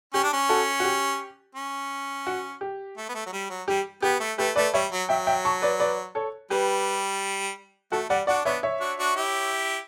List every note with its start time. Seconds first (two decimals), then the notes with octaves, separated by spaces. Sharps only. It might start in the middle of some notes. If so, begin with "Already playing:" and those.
0.14 C#4 G4
0.24 D4
0.33 C#4
0.49 F#4 A4
0.80 F#4
0.84 G4
1.55 C#4
2.27 F#4
2.61 G4
2.97 A3
3.09 B3
3.15 A3
3.26 F#3
3.32 G3
3.50 F#3
3.68 G3 G4
4.02 B3 G4
4.20 A3
4.38 A3 G4 B4
4.55 A3 B4 D5
4.74 G3 C#5 E5
4.92 F#3
5.09 F#3 E5 G5
5.27 E5 G5
5.45 A5 C#6
5.62 B4 D5
5.79 B4 D5
6.15 A4 C#5
6.50 G3 G4 B4
7.92 A3 F#4 A4
8.10 G3 D5 F#5
8.27 D4 F#4 D5 F#5
8.45 B3 D4 C#5 E5
8.63 C#5 E5
8.80 D4 F#4
8.98 D4 F#4
9.16 E4 G4